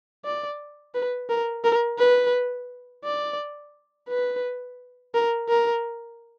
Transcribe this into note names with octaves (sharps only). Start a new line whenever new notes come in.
D5
B4
A#4
A#4
B4
D5
B4
A#4
A#4